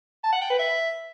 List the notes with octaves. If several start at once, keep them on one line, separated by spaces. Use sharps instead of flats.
A5
F#5
G5
B4
E5